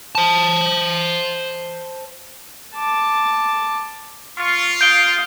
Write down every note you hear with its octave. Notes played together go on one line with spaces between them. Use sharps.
C5 A5
A5 D6
F4 C#6
F5 D#6 G6 D7 G7